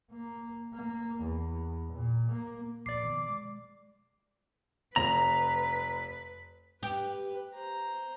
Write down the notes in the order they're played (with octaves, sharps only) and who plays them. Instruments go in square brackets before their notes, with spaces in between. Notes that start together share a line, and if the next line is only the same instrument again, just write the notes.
[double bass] A#3
A#3
E2
A#2
A#3
[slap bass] A#1 [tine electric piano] D5 C7 [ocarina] D6
[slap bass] B2 D#3 F3
G#3
[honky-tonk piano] F1 [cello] B4 [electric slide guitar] A#5
[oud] G4 [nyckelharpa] B4
[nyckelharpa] C5 A#5